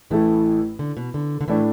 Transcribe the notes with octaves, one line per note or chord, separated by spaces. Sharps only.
A1 A2 E3 A3 E4 A4
D3
B2
D3
D3
A2 E3 A3 D4